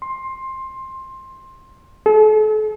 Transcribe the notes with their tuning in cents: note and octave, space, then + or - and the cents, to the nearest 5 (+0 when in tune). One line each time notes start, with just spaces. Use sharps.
C6 +15
A4 -40